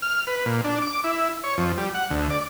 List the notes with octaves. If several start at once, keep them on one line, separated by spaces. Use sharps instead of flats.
F6
B4
A#2
D4
D6
E4
C#5
F2
G3
F#5
D2
D5